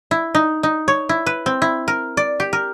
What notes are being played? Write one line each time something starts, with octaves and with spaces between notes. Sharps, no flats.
E4
D#4
D#4
C#5
E4
B4
C4
E4
A#4
D5
G4
A#4